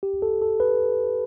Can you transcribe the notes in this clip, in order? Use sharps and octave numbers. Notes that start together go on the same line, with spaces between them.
G4
A4
A4
B4